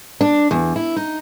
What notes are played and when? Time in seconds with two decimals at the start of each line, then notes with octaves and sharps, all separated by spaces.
0.21 D4
0.51 E2
0.76 E4
0.96 D#4